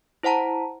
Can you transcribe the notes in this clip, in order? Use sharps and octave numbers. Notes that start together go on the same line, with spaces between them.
E4 C5 F#5 A5 A#5